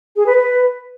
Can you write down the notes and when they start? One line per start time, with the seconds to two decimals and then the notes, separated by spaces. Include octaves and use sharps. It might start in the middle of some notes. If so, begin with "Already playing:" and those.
0.16 G#4
0.26 B4
0.37 B4